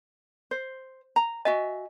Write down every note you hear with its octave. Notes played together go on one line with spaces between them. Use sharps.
C5
A#5
F#4 D#5 E5 G#5